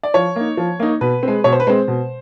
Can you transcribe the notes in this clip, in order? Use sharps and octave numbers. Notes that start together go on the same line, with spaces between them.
D5
F3 C#5
A#3 D#4
F3
A#3 D#4
B2 B4
G#3 C4
B2 C#5
C5
B4
G#3 C4 C5
B2